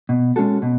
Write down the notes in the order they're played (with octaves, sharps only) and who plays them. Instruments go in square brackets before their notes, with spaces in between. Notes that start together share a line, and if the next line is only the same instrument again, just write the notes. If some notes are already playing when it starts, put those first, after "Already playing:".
[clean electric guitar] B2
G#3 C#4 F#4 A4
B2